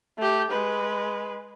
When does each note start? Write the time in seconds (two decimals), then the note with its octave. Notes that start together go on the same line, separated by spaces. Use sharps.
0.19 A3 G4
0.51 G#3 B4